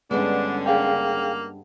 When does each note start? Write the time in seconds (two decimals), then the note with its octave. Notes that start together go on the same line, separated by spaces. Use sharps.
0.11 G2 D3 G#3 B3 C#4 D4
0.66 A#3 G#4 F5 G5